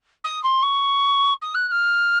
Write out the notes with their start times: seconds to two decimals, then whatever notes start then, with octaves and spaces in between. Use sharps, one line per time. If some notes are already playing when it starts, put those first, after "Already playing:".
0.24 D#6
0.43 C6
0.63 C#6
1.42 D#6
1.55 F#6
1.68 F#6
1.71 F6